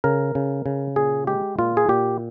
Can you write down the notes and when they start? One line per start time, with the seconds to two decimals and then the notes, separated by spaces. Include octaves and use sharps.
0.04 C#3 A#4
0.35 C#3
0.66 C#3
0.96 A#2 G#4
1.27 G#3 G4
1.58 A#2 F4
1.77 G#4
1.89 A#2 G4